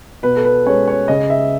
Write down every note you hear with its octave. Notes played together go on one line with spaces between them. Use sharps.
B2 B4
A4
B4
G#3 C#4 C#5
C#5
C#3 D#5
E5